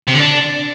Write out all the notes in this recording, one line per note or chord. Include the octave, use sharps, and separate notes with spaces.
C3
D3
D4